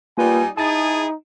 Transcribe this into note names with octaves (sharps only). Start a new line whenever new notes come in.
G3 A#3 D#4 F4 B4 G#5
D#4 E4 G#4 A5 A6